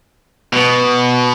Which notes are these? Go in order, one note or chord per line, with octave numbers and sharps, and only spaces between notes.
B2